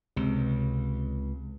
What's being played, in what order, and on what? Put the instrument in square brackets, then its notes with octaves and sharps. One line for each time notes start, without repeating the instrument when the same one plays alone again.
[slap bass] C#2 [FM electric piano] C3